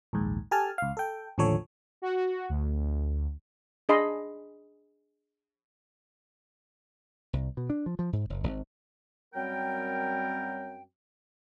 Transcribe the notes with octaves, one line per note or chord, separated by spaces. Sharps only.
A#1 D#2 G#2
G4 A4 G#5 A5 F6
C#2 F5
A4 G5
A1 D#2 D3 F3 A4 C#5
F#4
D2
D4 G#4 D#5 B5 C6
C2
B2
D4
F3
F3
G#2
F#1
G#1
F#2 F#3 G3 C4 A#4 G5